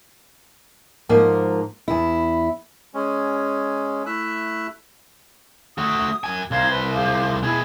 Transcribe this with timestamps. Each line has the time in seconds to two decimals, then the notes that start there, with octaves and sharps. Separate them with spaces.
1.09 G#2 F3 A#3 A#4
1.88 E2 E4
2.94 G#3 C#4
4.06 A3 E4 E5 E6 F#6
5.78 A3 F#4 D#6
6.24 F#2 G#5
6.51 C2 C5 F5 A#5 G#6
6.68 B4
6.93 G#4 F5 D6
7.44 B2 E4 G#4 G#5